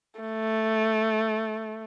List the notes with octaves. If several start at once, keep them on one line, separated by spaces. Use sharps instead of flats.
A3